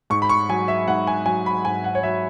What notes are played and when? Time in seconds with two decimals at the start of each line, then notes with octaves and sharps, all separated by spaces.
0.10 G#2 C#6
0.22 B5
0.29 C#6
0.49 F#3 G#5
0.68 E5
0.88 G#2 F#5
1.07 G#5
1.26 F#3 G#5
1.46 B5
1.65 G#2 G#5
1.84 F#5
1.95 C#5
2.03 F#3 E5